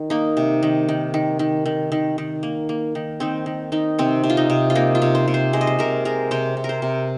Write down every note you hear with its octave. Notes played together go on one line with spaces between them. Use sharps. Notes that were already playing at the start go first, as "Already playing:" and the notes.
Already playing: D#3
A#3 D#4
C3
D#3
D#3
D#3
D#3
D#3
D#3
D#3
A#3
A#3
D#3
D#3 C4
D#3
D#3 D#4
C3 C4
C3
F4
D#4
C3
F4
A#3 D#4
F4
C3
C5
C3
C5
G#3 C5
D#5
C5
C3 A#4
G#3 A#4
C3 C5
C3
A#4
C5
C3